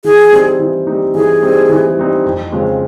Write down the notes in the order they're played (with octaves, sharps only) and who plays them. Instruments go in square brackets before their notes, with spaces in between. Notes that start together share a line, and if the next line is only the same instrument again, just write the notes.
[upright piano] E3 [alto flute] G#4
[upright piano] G3 C4 D#4
E3
G3 C4 D#4
[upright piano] E3 [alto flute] G#4
[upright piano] G3 C4 D#4
E3
G3 C4 D#4
F2
C#3 F3 G#3 C4